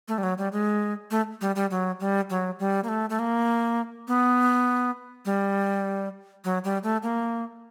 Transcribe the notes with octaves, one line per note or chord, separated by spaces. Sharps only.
A3
G3
F#3
G3
G#3
A3
G3
G3
F#3
G3
F#3
G3
A#3
A3
A3
A#3
B3
G3
F#3
G3
A3
A#3